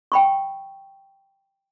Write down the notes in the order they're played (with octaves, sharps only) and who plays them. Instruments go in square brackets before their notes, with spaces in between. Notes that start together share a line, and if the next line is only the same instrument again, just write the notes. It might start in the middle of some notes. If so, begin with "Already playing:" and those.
[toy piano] G5 B5 C#6